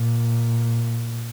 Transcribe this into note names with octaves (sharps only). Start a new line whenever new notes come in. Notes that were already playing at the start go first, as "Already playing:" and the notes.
Already playing: A#2